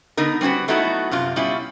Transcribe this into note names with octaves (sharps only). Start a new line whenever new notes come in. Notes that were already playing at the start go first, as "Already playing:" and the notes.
D3 B3 D#4 A#4
G3 C4 C#4 F#4 B4
F#3 A3 B3 D#4 E4 F#4
F#2 C3 F4
B2 G3 C#4 E4 F4